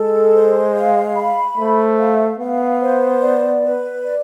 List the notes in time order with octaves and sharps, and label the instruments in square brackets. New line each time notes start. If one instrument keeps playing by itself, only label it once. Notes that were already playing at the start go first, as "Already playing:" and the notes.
Already playing: [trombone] G#3 [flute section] A4
[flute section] C5
F5
B5
[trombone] A3 [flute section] C5
[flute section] F5
[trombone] B3 [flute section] F5
[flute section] C5
D5
B4
D5